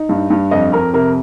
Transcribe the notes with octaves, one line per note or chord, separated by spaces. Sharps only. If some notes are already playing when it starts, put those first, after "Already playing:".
Already playing: D#4
G2
G2
F2 D#5
F2 A#4
C3 A#4